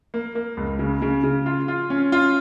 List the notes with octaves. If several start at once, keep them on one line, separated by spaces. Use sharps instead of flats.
A#3
A#3
C#2
C#3
C#3
C#3
F4
F4
C#4
F4